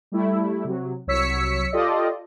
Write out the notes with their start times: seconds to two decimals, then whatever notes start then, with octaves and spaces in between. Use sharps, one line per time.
0.12 G3 A3 E4
0.64 C3 F#3
1.07 C2 F#3 C#5 E6 B6 C#7
1.73 F4 G4 A4 D5 D#5